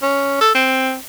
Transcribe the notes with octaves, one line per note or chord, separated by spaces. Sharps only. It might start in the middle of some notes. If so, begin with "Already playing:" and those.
C#4
A4
C4